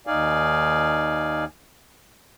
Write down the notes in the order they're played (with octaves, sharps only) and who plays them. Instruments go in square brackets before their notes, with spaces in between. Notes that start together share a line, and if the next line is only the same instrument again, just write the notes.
[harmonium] D#2 D#4 D5 F5 G#5